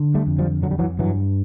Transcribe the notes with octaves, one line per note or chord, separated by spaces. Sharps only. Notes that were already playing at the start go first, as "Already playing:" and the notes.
Already playing: D3
G3 A3
F2
F3 G3
D3 F#3
G3
E3 F#3
G2 E3 F#3